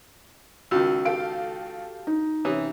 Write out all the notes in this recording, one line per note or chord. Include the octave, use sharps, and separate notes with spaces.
C#2 D#3 F#4 E6
G4 A4 F5 D7
D#4
C3 E3 C#4 D#6